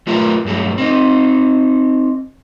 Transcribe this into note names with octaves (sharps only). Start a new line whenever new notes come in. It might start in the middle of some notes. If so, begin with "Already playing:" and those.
F#3 A3 F4 A#4 B4 E5
G2 F#3 A3
C4 D#4